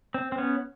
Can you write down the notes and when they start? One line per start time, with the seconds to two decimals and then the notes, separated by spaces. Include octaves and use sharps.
0.14 C4
0.32 C4
0.38 B3 C#4